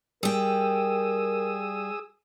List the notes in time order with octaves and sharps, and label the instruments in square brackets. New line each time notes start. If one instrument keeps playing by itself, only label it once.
[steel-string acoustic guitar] G3 G5 [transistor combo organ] G#4 D#6 E6 [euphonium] A#4